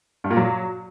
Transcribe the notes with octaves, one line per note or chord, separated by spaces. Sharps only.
G2
A#2
F#3